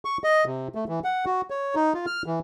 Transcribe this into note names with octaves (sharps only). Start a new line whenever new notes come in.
C#6
D#5
C3
A3
E3
F#5
F#4
C#5
D#4
F4
F6
E3